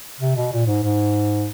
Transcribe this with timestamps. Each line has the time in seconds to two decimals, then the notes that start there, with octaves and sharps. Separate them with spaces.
0.20 C3
0.36 B2
0.52 A#2
0.67 G#2
0.83 G#2